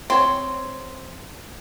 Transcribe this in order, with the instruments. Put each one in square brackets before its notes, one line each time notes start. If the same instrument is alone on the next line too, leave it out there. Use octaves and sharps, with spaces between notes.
[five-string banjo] C4 C#5 [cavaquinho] C6